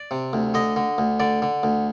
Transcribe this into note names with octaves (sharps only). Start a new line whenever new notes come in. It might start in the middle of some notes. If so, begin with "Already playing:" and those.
Already playing: D5
C3
D2
D3 D#5
D3
D2
D3 D5
D3
D2